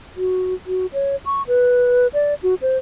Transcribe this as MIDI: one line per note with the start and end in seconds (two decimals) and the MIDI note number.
0.17 0.54 66
0.67 0.86 66
0.93 1.16 73
1.25 1.42 85
1.47 2.07 71
2.13 2.34 74
2.43 2.55 66
2.62 2.78 72